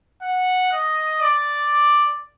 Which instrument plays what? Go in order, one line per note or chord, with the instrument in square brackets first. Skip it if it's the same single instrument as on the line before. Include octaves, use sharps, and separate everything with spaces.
[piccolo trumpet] F#5
D#5
D5